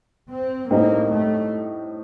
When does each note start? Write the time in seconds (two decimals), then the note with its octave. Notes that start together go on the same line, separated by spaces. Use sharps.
0.30 C4
0.70 A2 G3 A#3 C4 D#4
1.11 A3